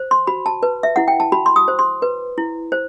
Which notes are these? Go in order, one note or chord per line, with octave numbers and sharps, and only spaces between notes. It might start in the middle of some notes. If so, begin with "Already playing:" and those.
Already playing: C5
C6
F#4 B5
A5
B4
E5
E4 F#5
G5
A5
F#4 B5
C6
D#6
C5
C6
B4
E4
C5